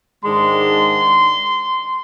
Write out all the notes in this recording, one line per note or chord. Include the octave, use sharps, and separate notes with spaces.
G#2 D#3 G#3 D4 C6